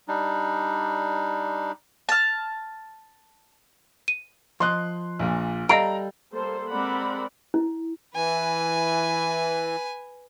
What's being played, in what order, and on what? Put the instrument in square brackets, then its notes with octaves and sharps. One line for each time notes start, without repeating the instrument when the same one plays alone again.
[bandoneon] G3 D4 D#4
[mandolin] A5 F6
[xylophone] D#7
[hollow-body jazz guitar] F3 D#5 [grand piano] C6 F#6
[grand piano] A#1 A#2
[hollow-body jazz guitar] G3 A4 [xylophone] D#5 F5 D7 [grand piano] A#5
[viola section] G3 A#3 A4 C5
G#3 C4 A#4 D5 F#5 B5
[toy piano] E4
[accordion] E3 [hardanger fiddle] B4 G#5